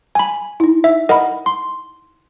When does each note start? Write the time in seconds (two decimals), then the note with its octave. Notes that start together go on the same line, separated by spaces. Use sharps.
0.15 G#5 B5
0.60 D#4 E4
0.84 E5
1.09 A#4 D#5 F#5 B5
1.46 C6